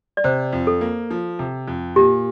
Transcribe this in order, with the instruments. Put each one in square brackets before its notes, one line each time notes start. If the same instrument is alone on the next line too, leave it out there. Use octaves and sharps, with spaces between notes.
[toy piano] D5
[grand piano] C3 [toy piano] C5
[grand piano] F2
[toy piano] A4
[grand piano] A#3
F3
C3
F2
[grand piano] A#2 [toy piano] G4